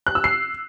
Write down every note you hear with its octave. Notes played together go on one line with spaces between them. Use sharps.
F#6
E6
C7